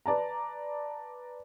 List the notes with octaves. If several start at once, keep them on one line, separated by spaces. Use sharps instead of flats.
B4 D5 A5 A#5